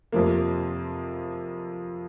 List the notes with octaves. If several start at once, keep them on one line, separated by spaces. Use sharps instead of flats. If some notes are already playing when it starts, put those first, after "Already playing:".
F2 C3 F3 A#3